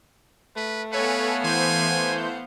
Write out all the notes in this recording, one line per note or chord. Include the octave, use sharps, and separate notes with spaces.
A3 B4
B3 A4 B4 C#5 F5 F#5 G#5
E3 C5 G#5 G6